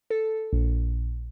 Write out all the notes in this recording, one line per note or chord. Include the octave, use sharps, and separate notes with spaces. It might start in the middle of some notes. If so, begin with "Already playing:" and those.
A4
A#1